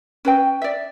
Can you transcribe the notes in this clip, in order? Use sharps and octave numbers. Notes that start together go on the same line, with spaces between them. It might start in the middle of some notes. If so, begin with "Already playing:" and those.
C#4 B4 G5
D5 E5